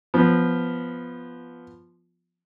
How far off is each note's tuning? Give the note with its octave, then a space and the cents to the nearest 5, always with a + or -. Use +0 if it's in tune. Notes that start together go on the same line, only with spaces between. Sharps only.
F3 -5 B3 +0